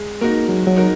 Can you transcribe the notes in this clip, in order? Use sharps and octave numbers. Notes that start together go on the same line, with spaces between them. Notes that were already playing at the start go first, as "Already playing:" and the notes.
Already playing: G#3
A#3 D#4 F#4 A#4
F#3 G#3
F#3
D#4 F#4 A#4